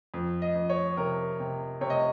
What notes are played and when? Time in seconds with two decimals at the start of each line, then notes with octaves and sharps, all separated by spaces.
0.14 F2
0.42 D#5
0.55 F2
0.70 C#5
0.97 C3 A#4
1.40 C3
1.81 C3 C#5
1.90 D#5